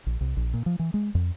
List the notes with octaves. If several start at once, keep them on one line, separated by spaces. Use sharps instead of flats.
A#1
C2
A#1
A#2
F3
E3
G#3
F2